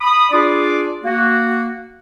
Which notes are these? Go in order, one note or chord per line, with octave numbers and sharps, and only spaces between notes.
B5 D#6
D4 F4 G#4 D5
A#3 F#4